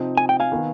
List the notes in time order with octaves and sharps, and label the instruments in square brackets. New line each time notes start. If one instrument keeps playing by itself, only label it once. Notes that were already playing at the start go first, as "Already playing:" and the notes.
Already playing: [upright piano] C3 F3 C4 D#4
[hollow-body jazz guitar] G#5
G5
F5 G#5
[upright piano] D#3 B3